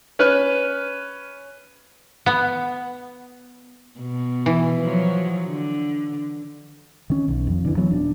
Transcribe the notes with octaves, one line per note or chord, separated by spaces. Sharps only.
C#4 B4 F6 F#6
B3
B2
E3
F3 F#3
D3
D#3 C#4
B1
F2
D3 E3
E3 F#3 B3
D#1 D4